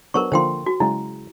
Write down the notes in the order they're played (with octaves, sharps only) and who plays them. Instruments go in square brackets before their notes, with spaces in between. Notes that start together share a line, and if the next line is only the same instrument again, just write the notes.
[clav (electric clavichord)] F#3 B3 D4 [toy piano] A#4 C5 C#6
[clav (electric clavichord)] D3 F3 A#3 [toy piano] C5 G5 C6
[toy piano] F#4
[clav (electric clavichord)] C#3 F#3 G#3 [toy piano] E4